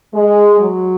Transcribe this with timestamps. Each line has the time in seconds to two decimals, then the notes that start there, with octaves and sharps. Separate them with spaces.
0.13 G#3
0.60 F#3